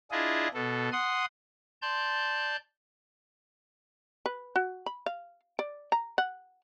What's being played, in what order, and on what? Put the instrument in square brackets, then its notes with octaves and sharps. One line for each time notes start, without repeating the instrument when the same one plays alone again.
[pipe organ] D4 E4 F4 G#4 D#5
B2 A4
F#5 C6 D#6
D5 A5 C6 G6
[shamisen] B4
F#4
B5
F5
D5
A#5
F#5